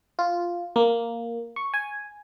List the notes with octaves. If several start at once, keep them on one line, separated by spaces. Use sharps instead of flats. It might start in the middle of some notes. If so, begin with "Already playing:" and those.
F4
A#3
C#6
G#5